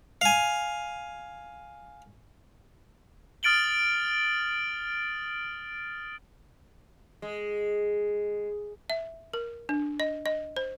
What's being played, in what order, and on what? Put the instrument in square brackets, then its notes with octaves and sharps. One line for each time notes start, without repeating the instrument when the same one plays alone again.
[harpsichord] F5 G#5
[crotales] D#6 F6 A6 D7 F#7 G7
[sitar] G#3
[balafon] E5
A#4
D4
D#5
D#5
C5